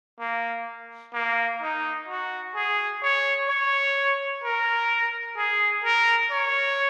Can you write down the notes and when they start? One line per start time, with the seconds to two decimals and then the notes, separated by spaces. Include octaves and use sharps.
0.20 A#3
1.14 A#3
1.62 D#4
2.08 F#4
2.56 G#4
3.03 C#5
3.49 C#5
4.44 A#4
5.37 G#4
5.84 A#4
6.31 C#5